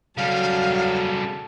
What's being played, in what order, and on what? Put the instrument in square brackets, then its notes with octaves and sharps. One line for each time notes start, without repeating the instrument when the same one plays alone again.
[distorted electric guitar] C#3 G3 [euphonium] F#3 [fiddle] A4 [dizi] F5